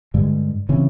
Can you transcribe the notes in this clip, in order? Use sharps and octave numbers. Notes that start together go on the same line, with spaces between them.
G2 D3 G#3
C#3 E3 C4 C#4